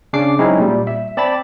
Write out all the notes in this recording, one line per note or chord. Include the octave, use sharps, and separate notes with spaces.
C#3 C#4 D4 D6 C7
F#3 G#3 C4 C#4 D#4 E4
A#2 G3
E5
C4 D5 A5 B5 A6